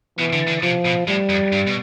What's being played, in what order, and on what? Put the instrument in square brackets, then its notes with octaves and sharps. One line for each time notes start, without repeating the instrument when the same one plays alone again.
[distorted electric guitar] B2 [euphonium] E3
[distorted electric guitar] D3
D3
[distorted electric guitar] C3 [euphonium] F3
[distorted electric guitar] B2
[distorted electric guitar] A2 [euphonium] G3
[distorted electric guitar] F2
G2
B2